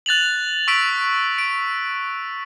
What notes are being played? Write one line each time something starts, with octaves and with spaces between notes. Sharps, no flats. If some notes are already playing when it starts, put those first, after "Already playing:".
F#6 A6 F7 F#7
C#6 E6 B6 D7
D7